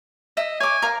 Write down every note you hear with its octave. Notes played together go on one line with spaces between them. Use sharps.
D#5 E5
C#5 G#5 D6
A#4 F5